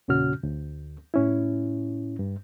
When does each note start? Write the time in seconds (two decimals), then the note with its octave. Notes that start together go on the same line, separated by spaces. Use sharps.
0.08 E2 A#2 C#3 C#4 F#4 F6
0.43 D2
1.14 A2 C#4 E4
2.19 G2